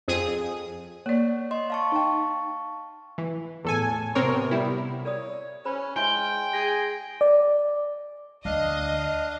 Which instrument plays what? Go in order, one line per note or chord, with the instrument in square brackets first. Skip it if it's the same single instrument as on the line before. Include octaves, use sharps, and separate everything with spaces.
[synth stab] F2 G#4 D#6
[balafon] A#3 D5 [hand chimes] C#5
[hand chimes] D#5 C6
F5 A5 C#6
[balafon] D#4 G5
[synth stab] E3
[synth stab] E2 A4 G#5 [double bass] A2
[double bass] C3 B3 [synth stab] C4 A#4 C#5
[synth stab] G3 E4
[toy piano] A#4 D5 D#6 [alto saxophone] C#5
[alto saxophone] C#4 [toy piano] B4 C5 B5
[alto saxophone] G#3 [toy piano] E4 E5 [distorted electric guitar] G5 [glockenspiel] G#5 C6 G6
[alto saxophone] G#4 [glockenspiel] A#6
[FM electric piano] D5
[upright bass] D2 [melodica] D4 F5 [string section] D#5